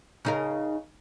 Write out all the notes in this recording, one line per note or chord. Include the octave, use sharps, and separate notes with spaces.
C#3 D#4 A#4